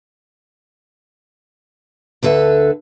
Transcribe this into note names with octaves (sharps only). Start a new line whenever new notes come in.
D2 D3 A4 B4 E5